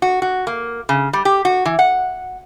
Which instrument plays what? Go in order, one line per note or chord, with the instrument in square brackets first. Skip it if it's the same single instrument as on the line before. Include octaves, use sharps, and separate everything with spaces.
[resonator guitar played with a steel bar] F#4
F#4
A#3
C#3
G3
G4
F#4
E3
F#5